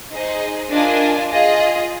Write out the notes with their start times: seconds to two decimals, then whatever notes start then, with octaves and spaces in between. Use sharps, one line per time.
0.11 D#4 G#4 C5 D#5
0.70 D4 F4 A#4 D#5 G#5
1.30 F4 G#4 D#5